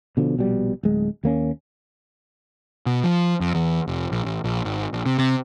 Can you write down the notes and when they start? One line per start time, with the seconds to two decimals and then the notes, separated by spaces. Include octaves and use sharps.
0.17 B2 D3 F3
0.37 A#1 B2 G3
0.83 D1 G#3
1.23 D#2 A#3 C#4
2.86 B2
3.04 F3
3.40 F2
3.55 E2
3.87 F1
4.12 A#1
4.25 A1
4.44 A#1
4.65 G#1
4.93 A#1
5.06 C3
5.19 C3